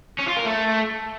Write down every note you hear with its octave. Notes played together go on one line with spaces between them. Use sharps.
C#4
F4
A#4
A3